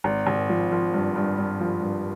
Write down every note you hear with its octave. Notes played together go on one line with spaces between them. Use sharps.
G#1
G#1
F3
F3
G2
G2
G2
F3
G2